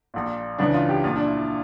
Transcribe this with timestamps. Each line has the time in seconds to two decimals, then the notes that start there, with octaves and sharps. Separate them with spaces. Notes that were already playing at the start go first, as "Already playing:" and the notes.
0.14 A#1 A#2
0.58 C#2 C#3 E3 D4
0.74 F4
0.89 G4
1.04 A#1 A#2 F4
1.16 D4
1.26 E4